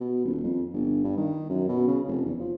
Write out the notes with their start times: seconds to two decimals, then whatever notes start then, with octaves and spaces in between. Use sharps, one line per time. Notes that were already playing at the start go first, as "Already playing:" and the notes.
0.01 B2
0.25 D#1
0.44 F2
0.73 G1
1.04 G2
1.17 D#3
1.50 F#2
1.68 B2
1.88 C#3
2.07 F1
2.25 E2
2.40 F3